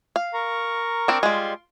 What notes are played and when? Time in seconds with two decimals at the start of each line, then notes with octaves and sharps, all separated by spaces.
0.16 F5
0.34 A#4 A#5 C#6
1.08 C4 D4
1.23 G3 G#3 F4 C6